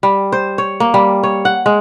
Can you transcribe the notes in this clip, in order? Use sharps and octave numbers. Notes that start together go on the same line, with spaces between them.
G3
C5
C#5
A#3
G3
C#5
F#5
G#3